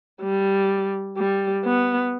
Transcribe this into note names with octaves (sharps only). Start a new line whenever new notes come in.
G3
G3
B3